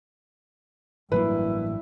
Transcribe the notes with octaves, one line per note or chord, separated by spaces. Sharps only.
A1 G2 F#3 A#3 E4 B4